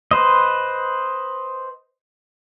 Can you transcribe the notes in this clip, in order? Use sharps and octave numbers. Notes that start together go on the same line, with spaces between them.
B4 C5 D#5